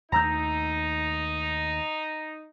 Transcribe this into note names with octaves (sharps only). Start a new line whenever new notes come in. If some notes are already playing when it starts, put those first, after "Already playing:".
D#2 A3 D#4 A#5 E6 G6